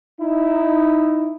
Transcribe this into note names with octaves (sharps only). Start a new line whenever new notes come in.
D#4 E4